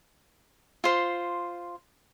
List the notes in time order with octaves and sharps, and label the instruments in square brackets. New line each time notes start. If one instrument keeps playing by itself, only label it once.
[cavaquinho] F4 C5